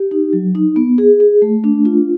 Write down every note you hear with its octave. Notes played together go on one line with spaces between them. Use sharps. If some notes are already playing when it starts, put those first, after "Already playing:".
Already playing: G4
D#4
F#3
D#4
B3
G#4
G#4
A3
D4
F4